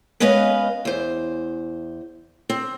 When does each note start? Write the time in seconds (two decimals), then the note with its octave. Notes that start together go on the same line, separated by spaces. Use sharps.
0.20 G#3 B3 C#4 B4 D#5 F5
0.85 E2 C5
2.50 C4